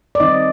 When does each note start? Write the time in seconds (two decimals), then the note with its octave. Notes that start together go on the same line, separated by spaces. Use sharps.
0.15 D5
0.20 D#3 G3 C4 D#4 D#5